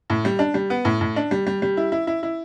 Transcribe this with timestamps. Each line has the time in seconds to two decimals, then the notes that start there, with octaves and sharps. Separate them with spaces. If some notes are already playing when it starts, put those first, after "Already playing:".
0.10 A2
0.25 G3
0.39 D4
0.54 G3
0.70 B3
0.85 A2
1.01 A2
1.16 D4
1.31 G3
1.47 G3
1.62 G3
1.77 E4
1.92 E4
2.07 E4
2.23 E4